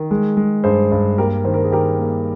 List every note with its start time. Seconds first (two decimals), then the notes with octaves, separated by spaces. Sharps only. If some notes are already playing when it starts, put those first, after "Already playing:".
Already playing: D#3
0.11 G#3
0.37 G#3
0.64 G2 G#4 C5
0.92 G2
1.18 A#3 G4 A#4
1.44 D#3 C5
1.54 A#4
1.64 G#4
1.71 D#3 G4 A#4
1.98 A#3